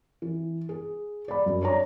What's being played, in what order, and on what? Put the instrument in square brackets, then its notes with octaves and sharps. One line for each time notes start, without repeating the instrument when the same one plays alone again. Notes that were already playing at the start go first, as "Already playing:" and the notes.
[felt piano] E3
G#4
D5 B5
F#2
D4 C#5 D5 A#5